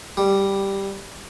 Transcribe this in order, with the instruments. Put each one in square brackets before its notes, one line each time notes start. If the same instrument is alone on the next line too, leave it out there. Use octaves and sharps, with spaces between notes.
[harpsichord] G3